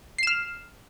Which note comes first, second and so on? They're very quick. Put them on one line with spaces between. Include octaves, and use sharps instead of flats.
C7 E7 F6